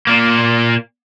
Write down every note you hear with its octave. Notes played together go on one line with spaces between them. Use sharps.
A#2 A#3